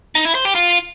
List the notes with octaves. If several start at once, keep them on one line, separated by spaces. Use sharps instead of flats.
D#4
E4
C5
G4
F4